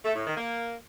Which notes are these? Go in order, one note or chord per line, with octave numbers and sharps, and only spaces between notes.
A3
A2
D#3
A#3